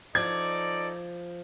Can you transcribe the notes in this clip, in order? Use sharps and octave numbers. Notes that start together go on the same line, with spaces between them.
F3 D#4 A4 D5 G#6